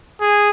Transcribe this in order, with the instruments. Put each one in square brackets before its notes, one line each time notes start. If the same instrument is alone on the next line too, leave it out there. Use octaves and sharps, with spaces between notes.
[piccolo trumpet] G#4